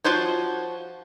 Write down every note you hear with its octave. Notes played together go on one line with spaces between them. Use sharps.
F3 F4 F#4 C5 C#5